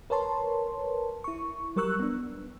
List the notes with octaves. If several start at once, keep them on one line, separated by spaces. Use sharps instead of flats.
A#4 B4 C#5 A5 C6
E4 C#6
F#3 G3 A#4 C#6 E6 F#6
B3 D4